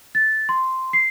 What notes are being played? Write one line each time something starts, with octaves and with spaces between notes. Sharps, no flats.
A6
C6
C7